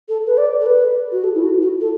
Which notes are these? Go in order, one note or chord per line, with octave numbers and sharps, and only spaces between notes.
A4
B4
D5
A4
B4
F#4
A4
E4
F#4
F#4
A4